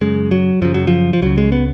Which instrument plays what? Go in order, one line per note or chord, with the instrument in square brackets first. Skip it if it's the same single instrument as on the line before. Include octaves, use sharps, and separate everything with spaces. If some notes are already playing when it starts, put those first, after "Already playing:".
[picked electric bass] F#2 C#3 G#3
F#3
F#2 C#3 F3
F#3
F3
F3
C#2 C#3 F#3
G#3
B3